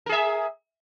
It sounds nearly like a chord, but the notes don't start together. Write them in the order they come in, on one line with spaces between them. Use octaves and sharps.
A#4 G#4 E5